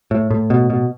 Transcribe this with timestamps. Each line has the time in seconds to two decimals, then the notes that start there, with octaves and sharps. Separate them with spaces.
0.11 A2
0.30 A2
0.50 B2
0.70 B2